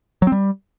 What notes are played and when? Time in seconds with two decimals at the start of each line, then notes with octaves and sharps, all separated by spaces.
0.22 F#3
0.27 C4
0.32 G3